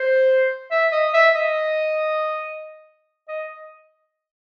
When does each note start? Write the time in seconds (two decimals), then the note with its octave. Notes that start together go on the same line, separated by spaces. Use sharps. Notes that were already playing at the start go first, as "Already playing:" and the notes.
Already playing: C5
0.71 E5
0.92 D#5
1.14 E5
1.35 D#5
3.29 D#5